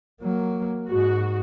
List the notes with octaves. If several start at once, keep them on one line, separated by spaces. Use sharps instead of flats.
F#3 A#3
G#2 F#4